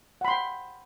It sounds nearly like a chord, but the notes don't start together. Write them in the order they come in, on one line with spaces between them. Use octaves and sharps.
F#5 B5 C6 G5